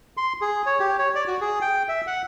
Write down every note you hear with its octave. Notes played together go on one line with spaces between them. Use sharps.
C6
G#4
C#5
G4
C#5
D5
F#4
G#4
G5
E5
F#5